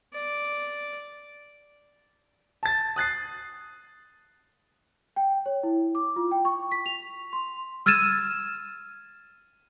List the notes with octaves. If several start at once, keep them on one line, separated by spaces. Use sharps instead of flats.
D5
A5 A6
D#6 F#6 A6 C7
G5
C#5
E4
D6
F4
G5
C#6
B6
F7
C6
E6 F6 G#6 A6 D#7 E7